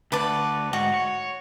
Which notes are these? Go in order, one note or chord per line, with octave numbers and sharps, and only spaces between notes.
D2 B4 D5 A5
G#2 F#4
C#5